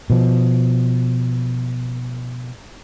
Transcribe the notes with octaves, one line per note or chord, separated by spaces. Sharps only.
B2 F3